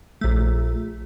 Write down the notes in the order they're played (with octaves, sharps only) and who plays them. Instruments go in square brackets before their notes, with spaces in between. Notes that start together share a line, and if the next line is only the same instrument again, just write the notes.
[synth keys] A#1 A3